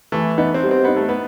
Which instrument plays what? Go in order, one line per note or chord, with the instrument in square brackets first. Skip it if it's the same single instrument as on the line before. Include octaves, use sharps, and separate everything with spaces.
[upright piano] E3 [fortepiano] A3
[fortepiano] B3 [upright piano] D#4
[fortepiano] C4
[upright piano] G3
[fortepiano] C4
[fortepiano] B3 [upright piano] D#4
[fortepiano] A3
B3